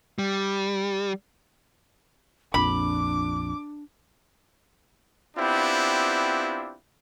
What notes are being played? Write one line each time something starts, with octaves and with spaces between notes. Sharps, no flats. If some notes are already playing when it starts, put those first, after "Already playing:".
G3
A#1 F2 D4 B5 D6
B3 C4 D4 E4 F4 G4